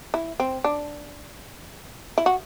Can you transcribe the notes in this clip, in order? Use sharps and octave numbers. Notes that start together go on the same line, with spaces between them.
E4
C4
D4
E4
F#4